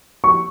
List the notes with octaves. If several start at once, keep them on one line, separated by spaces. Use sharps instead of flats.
C#6